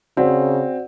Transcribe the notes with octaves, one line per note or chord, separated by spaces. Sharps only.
C#3 C4 F#4 D5 F#5